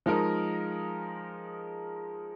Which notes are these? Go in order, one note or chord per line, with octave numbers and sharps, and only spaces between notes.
F3 G#3 D#4 A#4